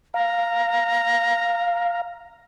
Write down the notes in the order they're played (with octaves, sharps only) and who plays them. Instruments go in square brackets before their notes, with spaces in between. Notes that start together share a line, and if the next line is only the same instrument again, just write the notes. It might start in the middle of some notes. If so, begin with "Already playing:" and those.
[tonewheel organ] F5 [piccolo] A#5